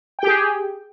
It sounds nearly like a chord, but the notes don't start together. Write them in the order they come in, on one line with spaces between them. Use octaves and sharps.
G5 G4 G#4